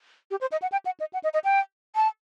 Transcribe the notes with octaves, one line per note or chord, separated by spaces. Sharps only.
G4
C5
D#5
F#5
G5
F#5
D#5
F#5
D#5
D#5
G5
A5